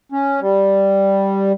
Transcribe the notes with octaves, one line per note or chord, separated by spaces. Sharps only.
C#4
G3